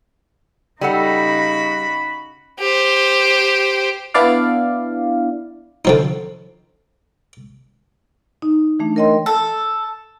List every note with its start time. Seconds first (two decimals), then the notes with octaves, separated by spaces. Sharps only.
0.81 C#3 G3 D#4 F#4 A4 F#5 B5
2.60 G4 C5
4.14 B3 D4 E4 D5 F5
5.85 D3 F3 D#4
8.42 D#4
8.80 E3 A3 D4
8.96 A#4 C#5 D#5 G5 C6
9.26 A4